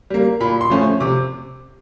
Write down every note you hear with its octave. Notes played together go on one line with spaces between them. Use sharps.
G3 A#3
A#2 B5
C6
F3 A3 C#4
C3 D6